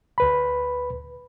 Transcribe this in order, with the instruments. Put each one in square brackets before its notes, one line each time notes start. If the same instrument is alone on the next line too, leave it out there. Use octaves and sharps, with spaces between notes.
[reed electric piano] D2 B4 B5